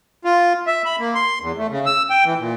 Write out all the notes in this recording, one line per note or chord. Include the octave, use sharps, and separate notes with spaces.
F4
E5
B5
A#3
C6
E2
A3
C#3
E6
G5
E3
A#2